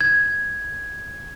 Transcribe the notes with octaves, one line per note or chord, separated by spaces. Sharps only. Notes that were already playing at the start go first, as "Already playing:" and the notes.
G#6